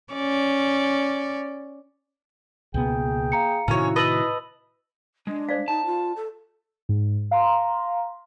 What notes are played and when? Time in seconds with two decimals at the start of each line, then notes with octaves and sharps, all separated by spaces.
0.13 C#4 D5
2.74 C#2 B2 A#3 B3 G#4 G5
3.32 F5 A#5 C#7
3.68 A2 C3 D#3 C#4 E4 F#4 C#5
3.96 B4 D#5 A5 B5 E6 F#7
5.27 G#3 D4
5.49 C5 D5 F5
5.68 D#4 A5
5.86 F4
6.16 A4
6.89 G#2
7.31 F5 A#5 C6